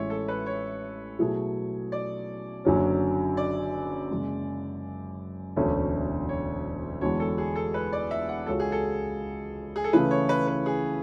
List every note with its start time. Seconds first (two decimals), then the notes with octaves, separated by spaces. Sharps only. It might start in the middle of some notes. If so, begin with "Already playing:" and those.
Already playing: A1 A2 G#3 C#5 E5
0.10 A4
0.28 B4
0.46 C#5
1.19 B2 F#3 A3 E4 G#4
1.92 D5
2.65 F#1 F#2 D3 F#3 C#4
3.37 D5
4.11 F#1 F#2 C#3 G#3
5.56 E1 D2 D3 A3 C#4
6.29 C#5
7.01 E2 D3 G#3 D4 F#4 C#5
7.20 A4
7.38 G#4
7.55 A4
7.74 B4
7.93 D5
8.11 E5
8.29 F#5
8.46 C#2 C#3 G#3 C#4 F#4 A4
8.60 G#4
8.72 A4
9.76 G#4
9.84 A4
9.93 C#3 E3 A3 E4 B4
10.11 C#5
10.29 B4
10.47 B4
10.66 G#4